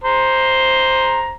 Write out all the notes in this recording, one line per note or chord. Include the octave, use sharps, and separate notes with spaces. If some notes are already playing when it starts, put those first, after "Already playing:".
C5 A#5